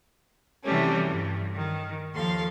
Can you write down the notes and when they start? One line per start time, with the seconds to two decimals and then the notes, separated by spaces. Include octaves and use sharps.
0.63 C3 E3 F#3 G3 A3 C#4
1.07 G2
1.54 D#3
2.14 D#2 F3 A4 F5 C6